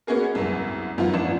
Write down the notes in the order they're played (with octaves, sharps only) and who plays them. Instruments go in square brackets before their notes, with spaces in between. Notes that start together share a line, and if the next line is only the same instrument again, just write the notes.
[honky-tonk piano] A#3 B3 C#4 F#4 G#4 A#4
C2 F#2
F#2 D#3 F3 B3 F4
A1 C#4 D4 E7